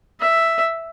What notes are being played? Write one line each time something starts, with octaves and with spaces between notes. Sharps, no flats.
E5